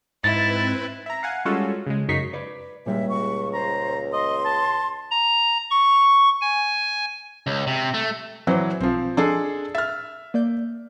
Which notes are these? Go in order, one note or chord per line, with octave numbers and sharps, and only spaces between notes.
G#2 C4 E4 B4 A6
E5 A#5
F5 F#5 G#5
G3 G#3 C#4 F4 F#4 A4
C#3 G#3
F#2 C#3 D#4 C#6 B6 C7
B4 D5
C#2 A#2 G3 G#3 E5
C#6
C5 A#5
D#5 C6
A5
A#5
C#6
G#5
C#2
C3
A3
E3 F#3 C5 D5 G6
B1 F3 C4
F3 D4 G#4 A4 D#5 C6
E5 F6 A6
A#3 D5 G6